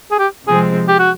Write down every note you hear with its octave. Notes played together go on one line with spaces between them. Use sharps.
G#4
G4
C3 F3 G#3 C4 G#4
G4
F#4